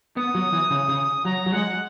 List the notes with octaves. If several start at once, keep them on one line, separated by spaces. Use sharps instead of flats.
B3 D#6
F#3
E3
C#3
C#3
F#3 A#5
F#3
G#3 F#5